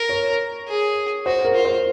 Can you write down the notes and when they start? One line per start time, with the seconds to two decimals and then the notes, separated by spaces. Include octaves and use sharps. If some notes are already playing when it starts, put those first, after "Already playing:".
Already playing: A#4
0.09 C#5
0.67 G#4
1.26 F#4 C5
1.45 A#4
1.55 F4
1.65 C5